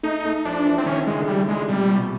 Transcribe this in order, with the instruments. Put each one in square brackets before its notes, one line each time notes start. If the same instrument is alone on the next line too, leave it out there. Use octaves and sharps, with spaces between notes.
[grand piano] A3 [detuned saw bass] D#4
[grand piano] A3
[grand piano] F3 [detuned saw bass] D4
[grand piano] E3
[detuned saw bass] C4
[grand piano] D#3 [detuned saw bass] C#4
[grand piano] D3
[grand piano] C#3 [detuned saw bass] G#3
[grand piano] D3
[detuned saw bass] G3
G#3
[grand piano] C3 [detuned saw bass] G3
[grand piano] A#2
B2